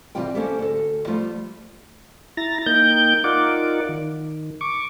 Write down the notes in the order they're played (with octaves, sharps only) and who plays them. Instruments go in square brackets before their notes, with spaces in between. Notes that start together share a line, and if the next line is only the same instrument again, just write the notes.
[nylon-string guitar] C3 E3 G3 C4 F4 G5
A#3 C#4 G4 A4 C5 E5
D2 A4
F3 G3 A3 F4
[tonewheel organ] E4 A#5 A6 A#6
A#3 D#4 G5 G6
D#4 F4 A#4 D5 F#5 D6
D#3
C#6 D6